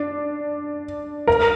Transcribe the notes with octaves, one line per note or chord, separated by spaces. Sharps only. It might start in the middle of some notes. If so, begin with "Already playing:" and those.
Already playing: D4
A#4